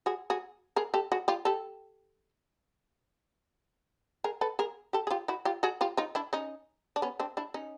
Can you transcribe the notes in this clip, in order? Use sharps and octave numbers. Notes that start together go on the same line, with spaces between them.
F#4 G#4
F#4 G#4
G#4 A#4
G4 A4
F#4 G#4
F4 G4
G4 A4
G#4 A#4
A4 B4
G#4 A#4
G4 A4
G#4
F4 G4
E4 F#4
F4 G4
F#4 G#4
F4 G4
D#4 F4
D4 E4
C#4 D#4
D4
B3 C#4
C4 D4
D4 E4
C#4 D#4